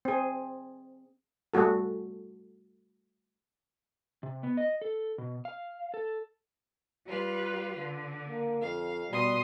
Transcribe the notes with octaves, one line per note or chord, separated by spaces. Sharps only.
C4 G#4
G3 A3 F#4 A4
C3
B3
D#5
A4
B2
F5
A4
G3 F4 B4
D3
A#3
F2 F5
B2 G3 C6 D#6